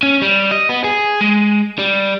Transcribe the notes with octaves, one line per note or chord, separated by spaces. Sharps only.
C#4
G3
D#5
B3
G#4
G#3
G3